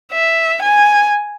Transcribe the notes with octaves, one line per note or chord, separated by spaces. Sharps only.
E5
G#5